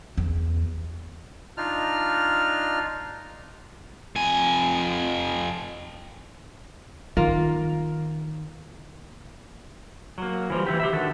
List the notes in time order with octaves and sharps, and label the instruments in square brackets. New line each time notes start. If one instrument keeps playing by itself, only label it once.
[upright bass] E2
[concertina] D4 D#4 F4 F6
[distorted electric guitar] F2 G#5
[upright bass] D#3 [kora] A#3 F4 A#4
[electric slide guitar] F#3 A#3
E3 F3 G3
E3 E4 G4
G4 E5
D3 D#3 F#4 A4